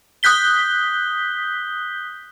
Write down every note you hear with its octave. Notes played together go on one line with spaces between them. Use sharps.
D#6 F#6 G6 B6 G7